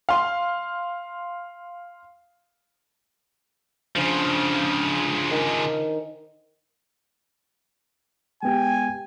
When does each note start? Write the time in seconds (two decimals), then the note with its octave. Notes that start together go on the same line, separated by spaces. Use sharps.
0.09 F5 C6
3.96 C#3 F3 D4 C5
5.31 D#3
8.43 G#3 B3 G4 G5 G#5